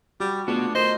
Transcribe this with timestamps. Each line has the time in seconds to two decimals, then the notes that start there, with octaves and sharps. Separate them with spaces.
0.20 G3 F#4
0.48 A3 B3 D4 F4 F#4 G#4
0.75 D#4 A4 A#4 C5 D#5